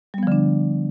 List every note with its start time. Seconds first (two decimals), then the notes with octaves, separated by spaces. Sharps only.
0.14 G3
0.18 B3
0.23 F3
0.27 D3
0.32 D4